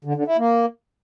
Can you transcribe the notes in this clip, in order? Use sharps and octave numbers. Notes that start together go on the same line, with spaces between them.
D3
D3
E4
A#3